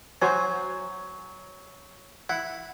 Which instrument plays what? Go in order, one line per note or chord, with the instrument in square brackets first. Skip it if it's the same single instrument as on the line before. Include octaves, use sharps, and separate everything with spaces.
[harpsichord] F#3 [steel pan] F#4 C5 G#5
[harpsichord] E4 [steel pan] F#5